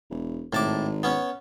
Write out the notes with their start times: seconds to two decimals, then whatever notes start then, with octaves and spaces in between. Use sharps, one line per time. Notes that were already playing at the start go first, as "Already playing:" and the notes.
0.10 E1
0.53 G#1 A2 A5 D6
1.03 B3 C#4